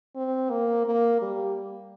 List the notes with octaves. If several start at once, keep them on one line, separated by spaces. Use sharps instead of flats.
C4
A#3
A#3
G3